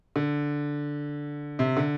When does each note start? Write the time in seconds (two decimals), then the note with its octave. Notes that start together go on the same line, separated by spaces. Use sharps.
0.16 D3
1.59 C3
1.77 D3